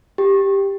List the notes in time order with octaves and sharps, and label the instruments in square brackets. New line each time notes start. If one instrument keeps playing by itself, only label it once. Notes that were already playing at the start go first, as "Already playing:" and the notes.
[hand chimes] G4